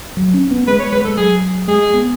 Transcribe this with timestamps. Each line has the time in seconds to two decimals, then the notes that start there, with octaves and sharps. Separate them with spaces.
0.17 F#3
0.34 C#4
0.51 B3
0.67 G#3 B4
0.79 C#5
0.92 G#3 B4
1.05 G#3 A4
1.17 F#3 G#4
1.68 G#3 G#4
1.94 B3